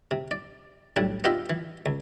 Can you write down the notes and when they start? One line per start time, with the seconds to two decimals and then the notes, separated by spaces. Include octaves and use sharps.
0.11 C3
0.31 D5
0.96 B1 A2 G3 D4
1.24 B3 D4 F4 G4 D#5 E5
1.50 E3
1.86 C#2